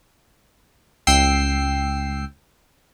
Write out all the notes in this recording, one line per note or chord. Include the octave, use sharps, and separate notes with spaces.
C#2 G5 E6 C7